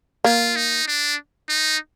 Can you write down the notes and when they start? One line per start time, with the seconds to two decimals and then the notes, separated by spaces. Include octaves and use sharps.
0.24 A#3 F4
0.56 D#4
0.88 D4
1.49 D#4